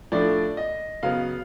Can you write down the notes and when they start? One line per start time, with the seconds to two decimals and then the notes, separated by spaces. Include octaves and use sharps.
0.12 A2 F3 A3 D4 D5
0.57 D#5
1.03 C#3 F#3 B3 F5